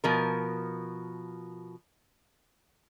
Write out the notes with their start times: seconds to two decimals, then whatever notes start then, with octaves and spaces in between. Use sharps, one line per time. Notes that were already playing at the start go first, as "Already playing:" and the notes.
0.04 B2 F3 A#4